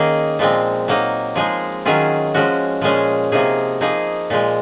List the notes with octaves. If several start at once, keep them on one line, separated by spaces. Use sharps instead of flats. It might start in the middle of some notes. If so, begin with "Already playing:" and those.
Already playing: D#3 A#3 C#4 D#4 G#4
A#2 F3 G#3 C4
F#3 A#3 D#4
F3 G#3 D#4 G#4
D#3 F#3 C#4 F4 G#4
F3 G#3 C#4 F#4
A#2 F3 G#3 C#4 G#4
C3 F3 A#3 D#4 G#4
F3 A#3 D#4 G#4
A#2 F3 G#3